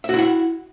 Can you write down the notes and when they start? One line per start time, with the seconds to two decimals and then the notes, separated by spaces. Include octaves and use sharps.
0.04 E5
0.09 F#4
0.14 E4
0.19 F#5